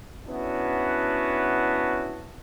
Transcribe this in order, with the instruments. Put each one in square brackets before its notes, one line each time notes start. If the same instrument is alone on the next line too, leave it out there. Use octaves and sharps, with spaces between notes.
[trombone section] B3 C#4 D4 E4 F#4